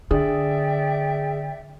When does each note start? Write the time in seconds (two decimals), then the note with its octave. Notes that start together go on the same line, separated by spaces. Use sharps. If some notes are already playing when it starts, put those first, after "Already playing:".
0.11 D3 G#4 D5 E5 G5